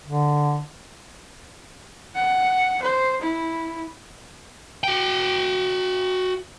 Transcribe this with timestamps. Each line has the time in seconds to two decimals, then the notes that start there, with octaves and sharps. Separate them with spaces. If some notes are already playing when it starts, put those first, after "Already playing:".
0.06 D3
2.16 F#5
2.82 C5
3.21 E4
4.84 F#4 G5